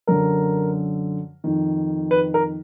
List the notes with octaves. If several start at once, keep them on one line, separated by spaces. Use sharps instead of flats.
F#2 D3 A#4
F2 D#3
B4
A#4